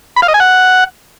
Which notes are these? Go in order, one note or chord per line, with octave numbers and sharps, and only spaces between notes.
B5
F5
D#5
G#5
F#5